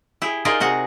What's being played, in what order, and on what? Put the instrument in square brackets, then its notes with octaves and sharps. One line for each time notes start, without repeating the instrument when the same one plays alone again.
[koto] E4 G4 G#4
D#4 F4 G4 G#4 A#4 D5
C3 F#4 G#4 F#5